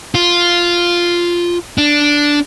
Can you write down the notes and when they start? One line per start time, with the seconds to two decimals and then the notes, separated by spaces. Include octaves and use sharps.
0.15 F4
1.78 D4